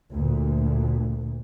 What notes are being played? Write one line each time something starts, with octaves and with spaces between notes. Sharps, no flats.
D2 A#2